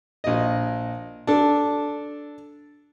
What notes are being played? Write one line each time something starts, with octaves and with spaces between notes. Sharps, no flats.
A#1 D#5
D4 A4